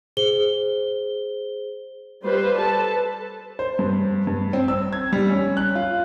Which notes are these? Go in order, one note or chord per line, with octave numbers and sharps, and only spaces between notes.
G#4 C5 G7
G3 F4 B4 C5
A4 B4 A5
C5
G2
G2
C4
E6
G#6
G3
C#4
F#6
F4